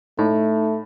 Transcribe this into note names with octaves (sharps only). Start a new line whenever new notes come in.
A2 A3 D#4